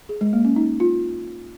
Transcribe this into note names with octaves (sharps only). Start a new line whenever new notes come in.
G#4
G#3
A#3
C#4
D#4
F4